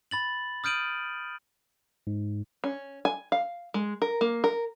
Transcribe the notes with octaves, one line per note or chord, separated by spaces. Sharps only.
B5 A6 F#7
D#6 F6 G6 D7 D#7 F#7
G#2
C#4
G#5
F5
G#3
A#4
A#3
A#4